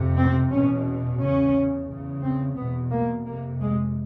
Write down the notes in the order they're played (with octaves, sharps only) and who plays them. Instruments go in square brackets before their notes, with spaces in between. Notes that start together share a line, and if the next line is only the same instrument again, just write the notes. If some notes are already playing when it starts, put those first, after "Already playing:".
Already playing: [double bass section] F2 C3
C4
E2 B2 C#4
E2 C#3 C#4
E2 C#3
C4
E2 B2 B3
A#3
F2 C3 A#3
G#3